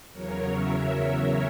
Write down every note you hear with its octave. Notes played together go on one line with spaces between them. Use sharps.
E2 C#3 F#3 A#4 C#5
C#5 E5